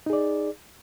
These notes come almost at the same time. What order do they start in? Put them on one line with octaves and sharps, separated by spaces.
D#4 G#4 D5